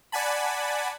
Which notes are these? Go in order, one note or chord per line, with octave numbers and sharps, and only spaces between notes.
D5 F#5 G#5 A5 B5